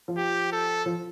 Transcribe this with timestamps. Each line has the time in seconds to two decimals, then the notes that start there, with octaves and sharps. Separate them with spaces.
0.08 F3
0.17 G4
0.52 A4
0.86 F3